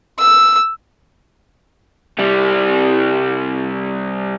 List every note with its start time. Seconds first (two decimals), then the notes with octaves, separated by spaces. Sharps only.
0.19 E6
2.18 C2 G3